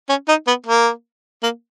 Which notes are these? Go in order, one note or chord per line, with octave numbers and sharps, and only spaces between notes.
C#4
D#4
B3
A#3
A#3